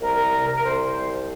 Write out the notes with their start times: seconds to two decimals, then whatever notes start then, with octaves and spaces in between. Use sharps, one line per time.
0.01 C2 A#4
0.32 C3
0.56 A#4
0.65 C2 C5
0.97 C2